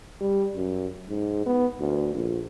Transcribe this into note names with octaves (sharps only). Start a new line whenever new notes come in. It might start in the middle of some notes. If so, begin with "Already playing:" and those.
G3
F#2
G#2
B3
D2
A#1